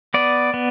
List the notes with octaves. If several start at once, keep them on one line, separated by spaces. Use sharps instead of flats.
B3 D5
B3